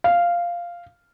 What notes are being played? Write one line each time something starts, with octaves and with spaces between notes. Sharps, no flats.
F5